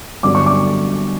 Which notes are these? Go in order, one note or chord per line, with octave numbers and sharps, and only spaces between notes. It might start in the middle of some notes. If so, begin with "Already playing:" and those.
G2 D3 F#3 B3 D4 D6
C#6
D6